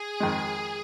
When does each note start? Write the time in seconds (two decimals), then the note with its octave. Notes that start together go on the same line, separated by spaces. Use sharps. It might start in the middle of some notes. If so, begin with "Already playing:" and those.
Already playing: G#4
0.20 F2 D#3 G#3